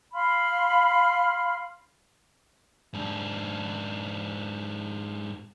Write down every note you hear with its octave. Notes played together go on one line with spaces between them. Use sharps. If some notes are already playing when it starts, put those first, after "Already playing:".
F5 B5 C6 F6
G#2 D4